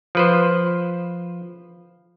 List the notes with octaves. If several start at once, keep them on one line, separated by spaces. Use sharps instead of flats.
F3 B4 C5